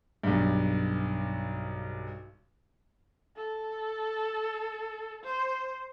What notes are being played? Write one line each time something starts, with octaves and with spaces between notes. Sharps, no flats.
B1 G2
A4
C5